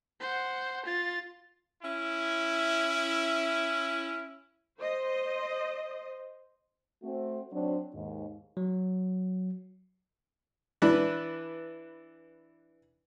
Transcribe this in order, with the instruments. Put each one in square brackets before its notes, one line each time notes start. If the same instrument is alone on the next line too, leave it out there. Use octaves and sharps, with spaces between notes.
[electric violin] C5 F#5
F4 A6
[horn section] C#4 E4
[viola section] C5 D#5
[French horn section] A3 C4 F#4
F#3 C4 D4
D#2 G#2
[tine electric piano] F#3
[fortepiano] E3 D4 B4